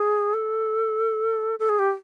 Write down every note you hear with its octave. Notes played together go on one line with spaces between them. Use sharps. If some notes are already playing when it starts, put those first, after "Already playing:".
Already playing: G#4
A4
A4
G#4
G4